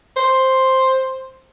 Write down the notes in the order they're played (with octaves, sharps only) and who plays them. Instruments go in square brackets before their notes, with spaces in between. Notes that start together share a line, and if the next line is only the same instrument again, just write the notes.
[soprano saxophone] C5